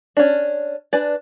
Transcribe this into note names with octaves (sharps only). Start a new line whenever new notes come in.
C#4 D4
D4 B4 D5 G#5